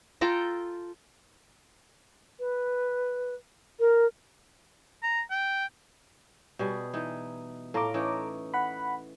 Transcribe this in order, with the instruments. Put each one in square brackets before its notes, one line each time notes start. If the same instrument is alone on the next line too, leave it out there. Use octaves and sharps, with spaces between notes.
[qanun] F4 A4 G5 A#5
[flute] B4
A#4
[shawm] A#5
G5
[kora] B2 G3 G#4
E3 D#4
[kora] A2 F4 [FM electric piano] A4 A#5 D6
[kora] E3 C#4 D#4
[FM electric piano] F#5 B5